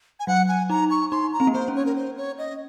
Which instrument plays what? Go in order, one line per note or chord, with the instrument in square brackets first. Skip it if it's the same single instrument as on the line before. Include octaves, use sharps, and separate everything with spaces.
[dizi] G#5
[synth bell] F#3 [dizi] F#5
[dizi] G#5
[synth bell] D#4 [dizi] A#5
[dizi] C#6
[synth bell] D#4 [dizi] C6
[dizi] A#5
[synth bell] C4
A#3
[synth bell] C4 [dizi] C5
[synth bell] C#4
[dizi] C#5
A#4
C5
C#5
D#5